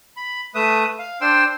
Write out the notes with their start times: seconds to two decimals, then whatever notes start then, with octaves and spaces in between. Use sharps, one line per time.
0.17 B5
0.55 A3 B4 E5 D#6
0.99 F5
1.21 D4 C5 G5 C6 E6